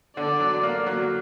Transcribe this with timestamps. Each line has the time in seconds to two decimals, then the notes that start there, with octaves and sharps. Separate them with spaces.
0.17 D3 D5
0.40 F#3
0.63 A#3
0.87 F#3